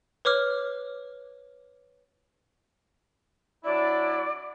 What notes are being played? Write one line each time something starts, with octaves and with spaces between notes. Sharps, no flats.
B4 C#5 D6 F6
F#3 D4 E4 D5